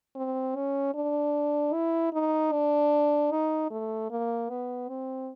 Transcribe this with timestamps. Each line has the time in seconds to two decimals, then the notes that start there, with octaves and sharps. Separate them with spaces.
0.16 C4
0.56 C#4
0.95 D4
1.73 E4
2.13 D#4
2.52 D4
3.31 D#4
3.71 A3
4.11 A#3
4.50 B3
4.89 C4